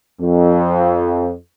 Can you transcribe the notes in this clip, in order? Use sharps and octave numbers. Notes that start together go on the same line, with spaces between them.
F2